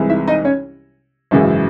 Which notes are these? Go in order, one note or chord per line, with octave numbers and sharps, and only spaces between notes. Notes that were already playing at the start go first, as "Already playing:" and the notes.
Already playing: C2 C3 E3 G#3
E4 E5
D#4 D#5
C#4 C#5
G#1 F#2 C#3 E3 G#3